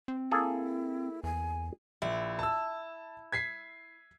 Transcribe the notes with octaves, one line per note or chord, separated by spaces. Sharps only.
C4
A#3 E4 G#4 A4
E2 G#5
A#1 E4
A5 E6
G#6 B6 C7